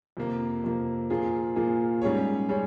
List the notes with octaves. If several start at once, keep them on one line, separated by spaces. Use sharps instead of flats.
F2 C3 F3 A#3
F2 C3 F3 A#3
A#2 F3 A#3 F4 G#4
A#2 F3 A#3 F4 G#4
G#2 G3 C#4 G#4 C#5
G3 C#4 G#4 C#5